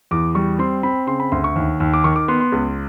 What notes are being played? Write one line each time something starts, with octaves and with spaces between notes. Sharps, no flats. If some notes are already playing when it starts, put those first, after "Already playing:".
E2 D6
G3 C#6
C4 C6
C4 B5
C#3 C6
B5
D2 C6
C#6
D#2
D#2
D6
D#3 C#6
D6
B3 C6
C6
C#2